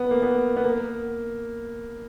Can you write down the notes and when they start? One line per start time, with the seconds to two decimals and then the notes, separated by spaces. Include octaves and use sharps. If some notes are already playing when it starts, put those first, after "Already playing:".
Already playing: B3
0.11 A#3
0.22 B3
0.57 B3
0.64 A#3